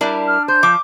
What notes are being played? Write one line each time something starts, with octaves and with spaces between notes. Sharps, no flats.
G3 D4 E4 A#4
F6
C5 G6
F3 D6